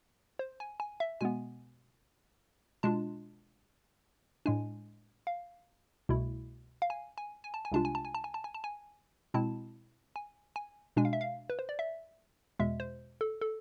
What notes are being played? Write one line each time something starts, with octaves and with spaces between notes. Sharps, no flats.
C5
G#5
G#5
E5
B2 G#3 B3 G#5
B2 G#3 D4 F4 A5
A2 G#3 D4 G#5
F5
C2 B2 A3 E4
F5
G#5
G#5
G#5
A5
G#5
C2 C3 G#3 D4 F4 A5
G#5
A5
G#5
A5
G#5
A5
G#5
A5
G#5
B2 G#3 C4 E4 A5
G#5
G#5
B2 G#3 D4 G#5
F5
E5
F5
B4
C5
D5
E5
E2 B2 G#3 E5
C5
A4
A4